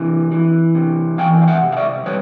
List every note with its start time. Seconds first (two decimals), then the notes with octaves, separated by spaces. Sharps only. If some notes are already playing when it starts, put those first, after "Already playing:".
Already playing: C3 E3
0.32 E3
0.75 C3
1.18 E3 F5 G5
1.42 F5
1.48 E5 F#5
1.63 C3
1.72 F5
1.77 D5 E5
2.06 G3 B4 C#5